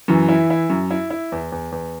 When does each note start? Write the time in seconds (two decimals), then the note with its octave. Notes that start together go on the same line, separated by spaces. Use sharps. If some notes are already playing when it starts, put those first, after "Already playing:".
0.08 F#2 E3
0.29 E4
0.50 E4
0.70 F#2
0.91 E4
1.10 E4
1.32 E2
1.52 E2
1.72 E2